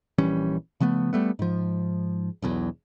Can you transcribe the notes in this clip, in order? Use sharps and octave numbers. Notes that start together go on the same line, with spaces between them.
A#1 E3 G3 C#4
C#3 F3 A3 B3
G3 A3 B3
G#2 F3
E1 B1 E2